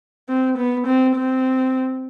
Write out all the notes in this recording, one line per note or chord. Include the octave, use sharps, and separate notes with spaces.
C4
B3
C4
C4